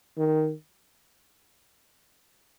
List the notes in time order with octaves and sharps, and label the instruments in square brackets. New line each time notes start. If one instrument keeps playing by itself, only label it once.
[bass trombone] D#3